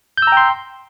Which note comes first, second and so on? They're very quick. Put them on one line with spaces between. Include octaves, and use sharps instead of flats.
G6 E6 A#5 G5 C6